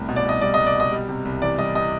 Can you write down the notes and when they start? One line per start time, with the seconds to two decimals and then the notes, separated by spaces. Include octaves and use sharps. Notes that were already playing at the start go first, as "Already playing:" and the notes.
Already playing: C2 A2
0.09 B2
0.16 D5
0.25 C2 D#5
0.41 G3 D5
0.54 D#5
0.58 C2
0.66 D5
0.76 B2 D#5
0.92 G3
1.09 C3
1.25 C2
1.42 E3 D5
1.59 G3 D#5
1.75 C3 D#5